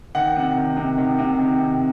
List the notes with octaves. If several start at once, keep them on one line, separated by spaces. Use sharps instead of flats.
D#3 F#5
C3
D#3
C3
D#3
C3
D#3
C3